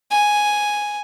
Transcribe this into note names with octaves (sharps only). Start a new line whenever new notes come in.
G#5